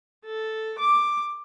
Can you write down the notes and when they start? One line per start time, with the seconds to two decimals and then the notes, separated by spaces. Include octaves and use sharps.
0.25 A4
0.79 D6